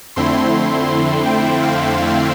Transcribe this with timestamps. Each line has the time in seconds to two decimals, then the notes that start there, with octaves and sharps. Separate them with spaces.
0.16 F2 D3 A3 C4 E4 C6
1.26 G5
1.62 F5
1.98 F5